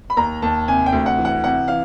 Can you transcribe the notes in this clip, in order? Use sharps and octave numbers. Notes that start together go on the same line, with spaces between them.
B5
D#2 A#5
D#2 A5
C3 G#5
G5
D2
F#5
E3
F#5
C3 F#5
E3 F5